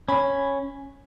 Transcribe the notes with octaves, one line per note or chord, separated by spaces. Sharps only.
C#4 B5